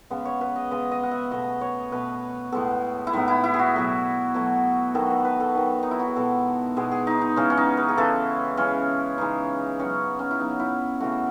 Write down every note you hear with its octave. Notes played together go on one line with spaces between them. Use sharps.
C#3 G#3 B3
C#5
B4
D#5
C#3 G#3 B3 D#5
D#5
F#5
E5
B2 A3 D#5
C#5
B2 A3 B4
A2 G#3 B3 A4
E4
A2 G#3 B3 D#4
E4
E4
G#4
F#4
B2 F#3 A3
B2 F#3 A3
D#3 F#3 B3 A4
B4
B4
A4
D#3 F#3 B3
D#4
E4
F#4
G#4
B2 G#3 B3 A4
B2 G#3 B3 G#4
G#4
D#4
D#4
C#3 E3 G#3 C#4
C#4
D#4
B4
G#4
C#3 E3 G#3 A4
C#3 E3 G#3 C#4
C#3 E3 G#3 D#4
C#3 F#3 B3 C#4
C#4
E4
C#3 F#3 B3 D#4
E4
C#3 E3 A3 F#4